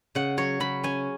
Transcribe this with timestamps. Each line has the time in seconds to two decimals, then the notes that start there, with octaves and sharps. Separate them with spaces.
0.15 C#3 F#5
0.37 F#3 C#5
0.60 C#3 B5
0.84 C#4 G#5